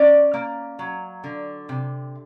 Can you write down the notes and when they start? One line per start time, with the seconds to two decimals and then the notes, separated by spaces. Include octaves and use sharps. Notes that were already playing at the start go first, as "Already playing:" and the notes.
Already playing: C#4 D5
0.34 A#3
0.79 F#3
1.24 D3
1.69 C3